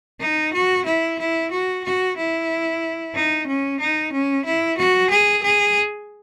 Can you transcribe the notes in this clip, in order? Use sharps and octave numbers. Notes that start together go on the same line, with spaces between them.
D#4
F#4
E4
E4
F#4
F#4
E4
D#4
C#4
D#4
C#4
E4
F#4
G#4
G#4